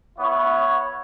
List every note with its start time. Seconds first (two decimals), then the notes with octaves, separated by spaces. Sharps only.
0.18 B3 E4 C#5